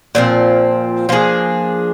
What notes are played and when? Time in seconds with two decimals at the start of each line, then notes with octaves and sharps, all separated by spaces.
0.15 A#2 F3 C4
1.09 F3 A#3 D4 G#4